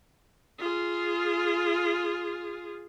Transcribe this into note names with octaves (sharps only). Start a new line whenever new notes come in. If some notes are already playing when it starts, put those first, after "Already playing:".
F4 G#4